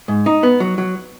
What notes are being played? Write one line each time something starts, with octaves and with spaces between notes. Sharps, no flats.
G#2
D#4
B3
F#3
F#3